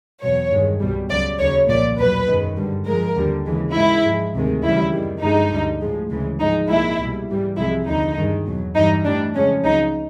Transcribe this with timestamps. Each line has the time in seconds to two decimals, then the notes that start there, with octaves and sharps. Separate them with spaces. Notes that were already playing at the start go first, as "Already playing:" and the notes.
0.22 E2 B2 F#3 C#5
0.52 G2 D#3 G#3
0.80 C2 B2 G3
1.10 C#2 C#3 F#3 D5
1.39 D#2 C#3 F#3 C#5
1.69 C2 A#2 F3 D5
1.98 E2 B2 F#3 B4
2.27 F#2 D#3 G#3
2.57 G2 D3 G3
2.86 G#2 F3 G#3 A#4
3.16 D#2 D3 G3
3.45 D#2 C#3 E3 G#3
3.75 G#2 D#3 G#3 E4
4.05 G#2 F3 G#3
4.34 D2 C3 D#3 G#3
4.63 D#2 C#3 E3 G3 E4
4.93 F#2 D#3 G3
5.22 G2 D3 F3 G#3 D#4
5.52 D2 D3 G3
5.81 A2 F3 G#3
6.10 D2 C#3 E3 G#3
6.40 G#2 F3 G#3 D#4
6.69 C2 A#2 F3 G#3 E4
6.99 C2 B2 G3
7.29 G#2 E3 G3
7.57 C2 C3 F3 G#3 E4
7.87 D#2 D3 F3 D#4
8.17 G2 D#3 G#3
8.46 E2 B2 F#3
8.75 G2 E3 G3 D#4
9.05 A2 E3 G3 D4
9.35 F2 C#3 F3 G#3 C#4
9.63 C#2 C#3 F#3 D#4